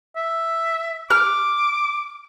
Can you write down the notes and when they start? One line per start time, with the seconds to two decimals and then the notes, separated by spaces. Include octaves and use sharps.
0.16 E5
1.10 D6 F6